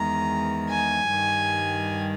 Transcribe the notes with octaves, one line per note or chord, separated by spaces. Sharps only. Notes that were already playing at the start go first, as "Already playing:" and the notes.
Already playing: E2 D#3 G#3 A#5
G#5
G2 D#3 G3